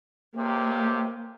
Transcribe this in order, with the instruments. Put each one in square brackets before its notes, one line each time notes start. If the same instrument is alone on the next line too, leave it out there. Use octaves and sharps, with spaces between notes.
[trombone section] C#2 C3 G4 [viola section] A#3